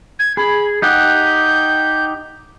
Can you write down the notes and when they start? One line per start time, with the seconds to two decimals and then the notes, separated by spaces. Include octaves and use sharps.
0.19 G#6
0.37 G#4 B5
0.82 D#4 G4 F#5 G6